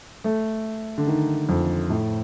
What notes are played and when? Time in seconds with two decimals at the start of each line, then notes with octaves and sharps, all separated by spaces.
0.24 A3
0.98 D3
1.07 D#3
1.49 F2
1.90 A2